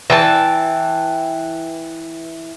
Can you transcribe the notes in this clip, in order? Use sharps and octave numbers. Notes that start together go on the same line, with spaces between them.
E3 G5 A5